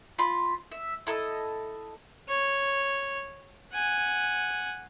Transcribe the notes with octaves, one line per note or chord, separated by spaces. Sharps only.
F4 B5
E5
E4 A4 D#5
C#5
F#5 G#5